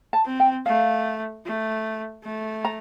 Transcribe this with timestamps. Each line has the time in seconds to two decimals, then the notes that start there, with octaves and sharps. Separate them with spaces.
0.13 A5
0.26 C4
0.40 G5
0.66 A3 F5
1.46 A3
2.24 A3
2.65 A#5